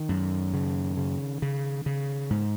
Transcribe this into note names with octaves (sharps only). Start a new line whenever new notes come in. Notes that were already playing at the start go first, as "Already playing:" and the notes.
Already playing: D#3
F#2
C#3
C#3
C#3
C#3
G#2